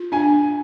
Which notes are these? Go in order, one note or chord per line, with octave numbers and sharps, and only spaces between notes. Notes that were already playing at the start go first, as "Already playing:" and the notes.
Already playing: F4
D4 G#5